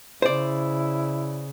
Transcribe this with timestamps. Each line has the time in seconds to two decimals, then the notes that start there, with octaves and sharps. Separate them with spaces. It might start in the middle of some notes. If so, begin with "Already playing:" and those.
0.22 C#3 E4 C5 D5